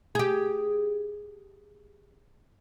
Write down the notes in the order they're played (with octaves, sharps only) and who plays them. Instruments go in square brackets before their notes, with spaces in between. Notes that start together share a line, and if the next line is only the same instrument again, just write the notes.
[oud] G4 G#4